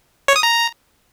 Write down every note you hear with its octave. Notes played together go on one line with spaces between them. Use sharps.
C#5
D#6
A#5